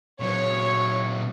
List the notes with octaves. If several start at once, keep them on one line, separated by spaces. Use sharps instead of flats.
A#2 F#3 C#5